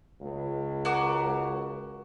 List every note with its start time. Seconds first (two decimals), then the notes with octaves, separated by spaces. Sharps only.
0.20 C#2
0.85 F#4 A#4 D6